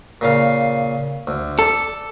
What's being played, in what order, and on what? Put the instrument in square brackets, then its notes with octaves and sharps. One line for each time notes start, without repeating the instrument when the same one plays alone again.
[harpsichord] A#2 C#3 F5
D2
[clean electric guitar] A4 [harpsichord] D5